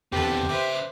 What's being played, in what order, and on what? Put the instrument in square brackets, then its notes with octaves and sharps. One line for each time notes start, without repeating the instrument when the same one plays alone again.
[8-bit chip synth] E2 D3 [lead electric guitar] B2 C4 [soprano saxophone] G4 [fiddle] A4 B4
[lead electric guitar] C#3 E5 [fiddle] B4 C5 [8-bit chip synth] D6